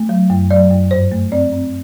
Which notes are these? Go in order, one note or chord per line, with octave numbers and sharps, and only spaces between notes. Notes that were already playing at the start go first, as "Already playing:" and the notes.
Already playing: A3
F#3
F#2
F#3 D5
F#2
G2 C5
A3
C4 D5
C4